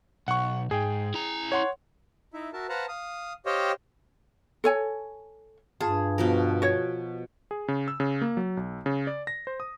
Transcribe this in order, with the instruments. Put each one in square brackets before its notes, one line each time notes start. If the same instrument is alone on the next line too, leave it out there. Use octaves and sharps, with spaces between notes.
[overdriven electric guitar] B1 [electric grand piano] F#5 C#6
[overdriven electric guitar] G#2 [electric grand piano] G#4 G5
[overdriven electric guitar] E4 A#5
[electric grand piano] C#5 F#5 C6
[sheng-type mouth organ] D#4 E4 E5
F#4 A#4 E5 A5
B4 C5 F5 F#5 A5 A#5
F5 D#6
G4 C5 C#5 D#5 F5 G5
[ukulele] A4 C#5 G#5
[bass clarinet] G2 [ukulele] F4 A5 [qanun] G#4
[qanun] B2 F3 A#4
[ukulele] F#4 C#5
[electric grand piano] G#4
C#3
E6
C#3
A#3
F#3
B1
C#3
D5
A#6
C5
D#6